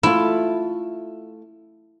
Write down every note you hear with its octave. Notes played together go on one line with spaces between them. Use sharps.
A3 E4 F4